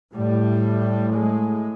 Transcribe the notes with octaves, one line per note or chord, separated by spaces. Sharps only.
A2 G3
G#3